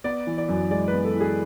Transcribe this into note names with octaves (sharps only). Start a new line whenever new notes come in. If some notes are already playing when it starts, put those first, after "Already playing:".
B3 D5
E3
D5
F#2
G#3 D5
B4
B3
A4
E3
G#4